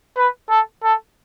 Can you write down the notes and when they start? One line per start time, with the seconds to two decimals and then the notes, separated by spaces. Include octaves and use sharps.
0.17 B4
0.50 A4
0.84 A4